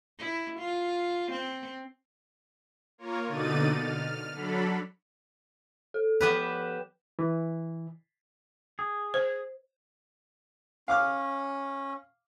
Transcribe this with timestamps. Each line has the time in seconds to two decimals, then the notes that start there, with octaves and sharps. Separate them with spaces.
0.19 E4
0.59 F4
1.31 C4
2.98 A#3 F4 A#4 C#5
3.26 B2 D3 D#4 D5 A6 D#7
3.74 F6
4.32 F#3 D4 A4 B5
5.94 A4
6.21 F3 B3 G4 A4 B4 E7
7.19 E3
8.79 G#4
9.14 C5
10.88 C#4 F5 D6 F6